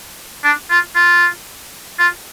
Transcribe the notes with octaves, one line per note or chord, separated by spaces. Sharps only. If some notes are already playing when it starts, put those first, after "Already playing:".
D4
F4
F4
F4